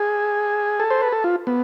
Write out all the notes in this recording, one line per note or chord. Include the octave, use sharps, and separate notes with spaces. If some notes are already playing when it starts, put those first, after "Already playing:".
Already playing: G#4
A4
C5
B4
A4
F4
B3